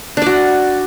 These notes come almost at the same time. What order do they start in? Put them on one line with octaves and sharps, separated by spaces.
D4 D5 F#4